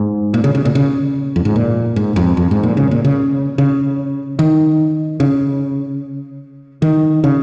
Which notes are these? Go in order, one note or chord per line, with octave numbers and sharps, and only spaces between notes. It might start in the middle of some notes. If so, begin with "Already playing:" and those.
Already playing: G#2
A#2
C#3
C#3
A#2
C#3
F2
G#2
A#2
G#2
F2
F2
G#2
A#2
C#3
A#2
C#3
C#3
D#3
C#3
D#3
C#3